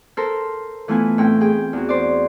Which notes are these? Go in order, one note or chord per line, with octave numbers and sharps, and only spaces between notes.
A4 A#4 C5
E3 A3 B3 F4 B4 G#5
A2 C4 G5
G#4 G5
E2 F#4
C5 D5